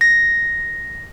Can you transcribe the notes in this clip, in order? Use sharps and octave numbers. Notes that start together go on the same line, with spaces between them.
A#6